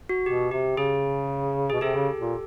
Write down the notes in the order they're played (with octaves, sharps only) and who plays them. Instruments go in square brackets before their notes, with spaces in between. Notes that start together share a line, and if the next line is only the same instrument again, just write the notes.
[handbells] F#4
[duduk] B2 [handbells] G4
[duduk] C3 [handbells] G4
[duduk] C#3 [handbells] G#4
[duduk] B2 [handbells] G#4
[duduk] C3 [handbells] G4 A4
[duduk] C#3
A#2